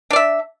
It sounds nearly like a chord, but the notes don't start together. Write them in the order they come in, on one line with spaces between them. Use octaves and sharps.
D4 D5 E5